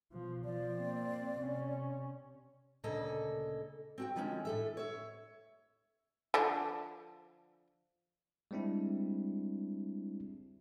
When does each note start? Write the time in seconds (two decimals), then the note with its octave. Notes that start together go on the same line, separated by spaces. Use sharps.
0.12 B2 F3
0.45 F3 D5
0.76 A#3 C4
1.40 C3 C#4
2.84 D2 A#2 C#3 A#3 A4 D#5
3.98 C4 F#4 G5
4.16 D3 D#3 F3 G#3 A#3 C#4
4.45 A2 A4 E5
4.77 C#5 E5
6.34 D3 F3 D4
8.51 G3 G#3 C4 D4 E4